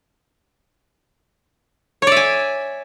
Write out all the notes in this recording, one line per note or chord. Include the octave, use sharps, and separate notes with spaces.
C#5 D5 E5 G#5